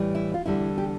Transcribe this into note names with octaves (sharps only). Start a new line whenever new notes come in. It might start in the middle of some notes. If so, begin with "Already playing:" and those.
Already playing: A2 E3 G3
E4
F4
E2 D3 G3 E4
G4